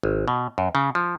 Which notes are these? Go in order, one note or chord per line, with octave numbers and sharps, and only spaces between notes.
G#1
B2
F#2
C#3
F3